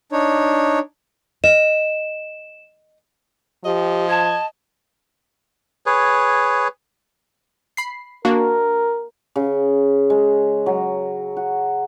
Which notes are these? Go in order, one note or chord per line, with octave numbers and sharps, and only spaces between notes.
D4 D#4 C#5
D#5 E7
F3 G4 D#5
A5 G#6
G#4 B4 C#5
B5 C7
A#3 D4 F#4 A#4
C#3
G#3
F#3
F#4